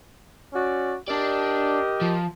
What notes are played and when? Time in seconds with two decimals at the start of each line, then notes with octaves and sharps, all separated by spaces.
0.53 C#4 F#4 D5
1.08 D4 G4 A#4 D5 D#5
2.01 F3